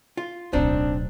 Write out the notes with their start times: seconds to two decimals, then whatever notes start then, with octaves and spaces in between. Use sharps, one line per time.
0.17 F4
0.53 D1 B1 C4 D4 D#4